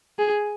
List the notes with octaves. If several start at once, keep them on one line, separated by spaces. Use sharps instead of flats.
G#4